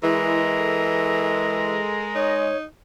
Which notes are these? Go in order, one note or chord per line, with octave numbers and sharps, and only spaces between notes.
E3 G#3 E4 A#4
A4
D#4 C#5